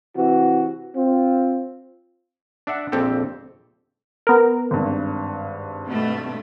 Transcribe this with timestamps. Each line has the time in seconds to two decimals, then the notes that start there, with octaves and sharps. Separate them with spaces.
0.17 C3 E3 F#4
0.96 C4 F4
2.67 D4 E5 F#5
2.92 A#1 F2 C4 G4 A4
4.27 B3 A#4
4.71 G#1 G2
5.87 B2 A3